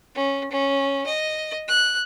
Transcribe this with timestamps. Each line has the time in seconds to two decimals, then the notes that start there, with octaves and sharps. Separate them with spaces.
0.15 C#4
0.51 C#4
1.06 D#5
1.68 F#6